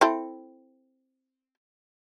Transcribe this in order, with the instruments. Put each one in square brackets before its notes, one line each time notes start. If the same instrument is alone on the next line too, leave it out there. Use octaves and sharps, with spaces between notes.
[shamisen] C4 E4 A4